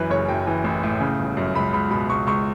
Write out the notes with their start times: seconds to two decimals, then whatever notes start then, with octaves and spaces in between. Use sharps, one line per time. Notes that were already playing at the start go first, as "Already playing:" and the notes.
Already playing: F#2 E3 B4
0.10 F#1 C#5
0.28 F#2 G5
0.47 E3
0.64 A1
0.83 A2
1.00 C#3
1.19 G1
1.37 F#2
1.55 C#2 B5
1.73 C#2 B5
1.91 B2 B5
2.10 C#2 C#6
2.27 C#2 C#6